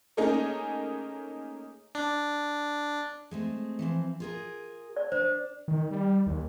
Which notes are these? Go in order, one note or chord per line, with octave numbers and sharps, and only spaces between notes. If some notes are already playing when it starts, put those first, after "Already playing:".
A3 A#3 C#4 D#4 G#4
D4
G#3 A3 C4
E3 F3 C4
F4 G#4 A#4
D5
D4 C5
D#3
G3
D#2